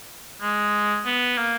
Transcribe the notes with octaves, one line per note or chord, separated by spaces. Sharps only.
G#3
B3
A#3